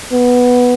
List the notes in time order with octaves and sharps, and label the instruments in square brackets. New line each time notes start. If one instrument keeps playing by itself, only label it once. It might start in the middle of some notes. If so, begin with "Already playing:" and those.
[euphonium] B3